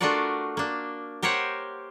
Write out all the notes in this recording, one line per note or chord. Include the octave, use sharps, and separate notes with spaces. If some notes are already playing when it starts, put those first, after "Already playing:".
A3 D4 F4 F#4 A#4 D5
A#3 D4
G4 A#4 C5 C#5 F#5